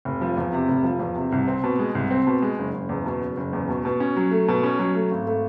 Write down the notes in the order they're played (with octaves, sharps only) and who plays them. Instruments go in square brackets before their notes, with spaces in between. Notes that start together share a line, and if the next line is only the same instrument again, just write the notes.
[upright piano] F1
F3
E2
C3
F1
F3
E2
C3
C2
C4
B2
G#3
C2
C4
B2
G#3
F#1
F#1
E2
B2
F#1
F#1
E2
B2
B2
C#4
F#3
A3
B2
C#4
F#3
A3
G#1
A3